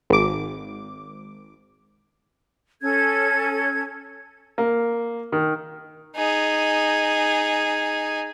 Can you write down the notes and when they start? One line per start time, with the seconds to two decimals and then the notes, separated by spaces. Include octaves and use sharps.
0.10 G#1 D6
2.82 C#4 A4 G#6
4.58 A#3
5.32 D#3
6.16 D#4 G#4